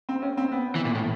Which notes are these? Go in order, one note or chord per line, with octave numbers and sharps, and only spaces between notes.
C4
C#4
C4
B3
E3
A#2
A2